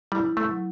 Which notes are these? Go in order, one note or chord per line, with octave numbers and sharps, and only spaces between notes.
G3 E4
A3
F#3